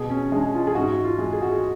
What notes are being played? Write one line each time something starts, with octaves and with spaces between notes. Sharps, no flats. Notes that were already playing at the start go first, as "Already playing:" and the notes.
Already playing: B2 G#4
C#4
G#3 D4
F4
G#4
G#2 F#4
F#4
F4
G#3
G#4
F#4
G#4